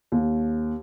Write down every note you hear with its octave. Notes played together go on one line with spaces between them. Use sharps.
D#2